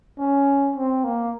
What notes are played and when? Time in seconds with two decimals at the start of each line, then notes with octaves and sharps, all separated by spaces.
0.19 C#4
0.76 C4
1.04 A#3